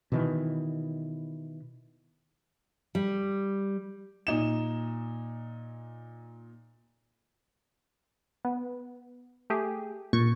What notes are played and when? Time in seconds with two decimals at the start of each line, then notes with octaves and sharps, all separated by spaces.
0.12 B2 D#3 E3
2.95 G3
4.27 A#2 D#4 E7
8.45 B3
9.50 A3 G4 G#4
10.13 A#2 C#6